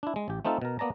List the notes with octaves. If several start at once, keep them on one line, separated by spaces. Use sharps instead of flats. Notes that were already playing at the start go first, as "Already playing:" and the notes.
D4 E4
G#3
A1 G4
A3 C4 D#4 F4 A4
B2 A#4
A#3 B3 D5 A5 A#5